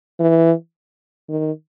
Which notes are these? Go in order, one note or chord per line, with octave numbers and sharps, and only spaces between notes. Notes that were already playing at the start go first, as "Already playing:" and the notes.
E3
D#3